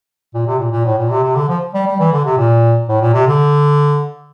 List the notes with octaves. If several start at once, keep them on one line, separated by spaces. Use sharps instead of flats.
A#2
C3
A#2
A#2
A2
A#2
C3
C3
D3
F3
G3
G3
E3
D3
C3
A#2
A2
A#2
C3
D3